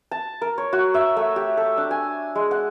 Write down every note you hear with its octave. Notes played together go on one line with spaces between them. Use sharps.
A5
A#4
C#5
F#4
E5
A3
G4
A4
D4
G#5
G#3
F#5